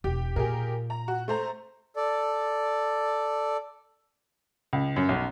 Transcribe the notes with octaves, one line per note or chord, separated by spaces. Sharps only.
E1 G4
A#2 G4 G#4 A#4
A#5
F#4
A3 C5 A#5
A4 D5
C#2
F#2
B1